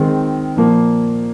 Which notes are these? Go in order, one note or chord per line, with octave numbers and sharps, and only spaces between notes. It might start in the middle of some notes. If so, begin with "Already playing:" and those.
Already playing: D#3 G#3 C4
A#2 F3 A#3